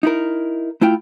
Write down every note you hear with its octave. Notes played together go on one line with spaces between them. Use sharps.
D#4 E4 A#4
A3 E4 F4 G5